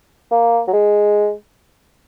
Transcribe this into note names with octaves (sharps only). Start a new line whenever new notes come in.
A#3
F#3
G#3